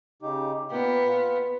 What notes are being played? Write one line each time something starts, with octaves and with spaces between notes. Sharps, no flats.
C#3 D#4 G4
A#2 A#3 B3 G5
F4